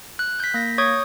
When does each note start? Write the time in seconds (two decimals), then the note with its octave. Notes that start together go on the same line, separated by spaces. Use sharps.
0.19 F#6
0.40 G6 B6
0.54 A#3 A#6
0.78 C#5 C#6 D#6 G6 G#6